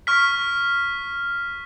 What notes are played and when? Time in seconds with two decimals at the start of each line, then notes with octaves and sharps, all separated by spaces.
0.07 C#6 F6 B6